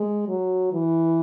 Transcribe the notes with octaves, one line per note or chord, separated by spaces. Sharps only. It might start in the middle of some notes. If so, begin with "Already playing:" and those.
Already playing: G#3
F#3
E3